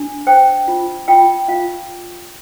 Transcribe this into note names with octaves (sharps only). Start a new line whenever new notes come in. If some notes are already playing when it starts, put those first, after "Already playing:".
Already playing: D4
C5 G5
F4
F4 G5
F4 F5